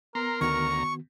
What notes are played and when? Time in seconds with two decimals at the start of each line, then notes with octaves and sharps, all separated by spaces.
0.15 B3 A#4 A#5 C6
0.41 D2 D#3 B3 F#4 A#5 C#6